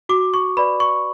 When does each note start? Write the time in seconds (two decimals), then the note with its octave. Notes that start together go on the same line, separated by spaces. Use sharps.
0.09 F#4 D6
0.34 C#6
0.57 B4 D5 B5
0.80 C#6